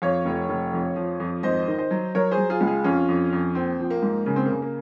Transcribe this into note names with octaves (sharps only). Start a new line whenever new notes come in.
F2 C#5 F5
F1
F1
F2
F3
F2
G#1 C5 D#5
D#3
C5 D#5
F#3
F#3 A#4 C#5
G#4 C5
F#3
F4 G#4
C#2
F4 G#4
F2 C#4 F4
F2
F2
A#1 C4
F3
A#3
G#2
C#3 A#3
C4
C#3 A#3
A#3